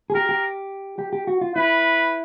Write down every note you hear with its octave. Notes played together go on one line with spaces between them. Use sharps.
G#4
G4 A#4
G4
G4
G4
F#4
F4
E4 B4